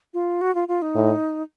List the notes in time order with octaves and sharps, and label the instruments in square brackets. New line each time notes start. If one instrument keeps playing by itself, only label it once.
[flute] F4
F#4
F4
F4
D#4
[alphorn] A2